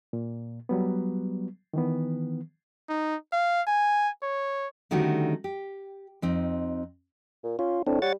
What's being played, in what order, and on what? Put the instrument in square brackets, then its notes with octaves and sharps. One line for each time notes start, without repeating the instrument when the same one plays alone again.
[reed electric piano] A#2
F#3 G3 B3
D#3 E3 B3
[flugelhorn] D#4
F5
G#5
C#5
[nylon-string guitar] D3 D#3 G3 A3 C#4 F#4
G4
F2 C4 D#4
[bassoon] A#2
[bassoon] C#4 [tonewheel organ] F4
[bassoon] A2 [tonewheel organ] C4 D4
[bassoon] G3 [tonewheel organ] C#5 F#5 A6